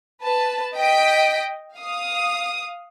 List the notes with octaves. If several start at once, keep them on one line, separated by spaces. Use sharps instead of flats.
B4 A5
D#5 G5 B6 D7
F5 D#6